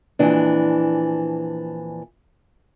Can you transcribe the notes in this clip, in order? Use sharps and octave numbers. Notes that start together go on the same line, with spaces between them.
F2 A#2 E3 D4